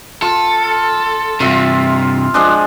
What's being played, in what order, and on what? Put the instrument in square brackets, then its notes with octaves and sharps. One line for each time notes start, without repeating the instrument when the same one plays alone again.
[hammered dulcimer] F4 [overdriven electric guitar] A4
[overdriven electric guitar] G2 C3 [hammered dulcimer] F4 E5
[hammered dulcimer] F3 G#3 D4